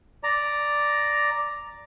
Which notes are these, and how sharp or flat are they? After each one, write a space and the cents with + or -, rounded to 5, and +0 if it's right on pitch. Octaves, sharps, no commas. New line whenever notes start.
D5 +0 A#5 +0